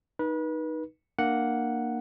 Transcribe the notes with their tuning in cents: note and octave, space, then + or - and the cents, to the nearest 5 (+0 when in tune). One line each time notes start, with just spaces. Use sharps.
D#4 +0 B4 -30
A#3 +0 D4 +30 F#5 +0